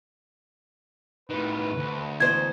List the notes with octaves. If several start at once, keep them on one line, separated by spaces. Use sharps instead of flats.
A2 D#3 B4
D2
E2 G#3 C5 G#6